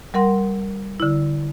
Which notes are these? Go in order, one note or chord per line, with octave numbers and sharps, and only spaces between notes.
G3 A#4 F#5 C6
D3 E4